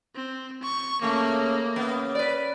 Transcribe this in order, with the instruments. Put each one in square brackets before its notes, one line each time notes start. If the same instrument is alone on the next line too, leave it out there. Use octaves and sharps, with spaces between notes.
[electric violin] C4
C#6
[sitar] C#3 A3 [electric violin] A#3
[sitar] C#3 B3
B4 D5